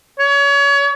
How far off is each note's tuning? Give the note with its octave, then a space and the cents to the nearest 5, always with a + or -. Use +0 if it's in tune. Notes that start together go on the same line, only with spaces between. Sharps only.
C#5 +30